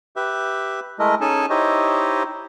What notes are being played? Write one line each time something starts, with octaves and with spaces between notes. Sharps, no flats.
G4 B4 E5
G#3 A3 E4 A#4 D#5
C#4 D#4 G#4 A4 G#5 A5
D#4 E4 G4 C5 C#5 D#5